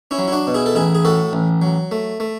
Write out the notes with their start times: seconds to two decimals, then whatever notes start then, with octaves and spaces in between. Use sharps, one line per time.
0.11 C#4 E4
0.19 F#3
0.28 E4
0.32 D4 F#4
0.47 B2
0.54 E4 G#4
0.66 A4
0.75 A1 E4 G#4
0.95 G#4
1.05 A2 F#4 A4
1.33 A1
1.62 F#3
1.91 A3
2.20 A3